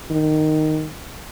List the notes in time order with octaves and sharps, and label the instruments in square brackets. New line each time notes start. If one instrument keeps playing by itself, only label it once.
[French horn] D#3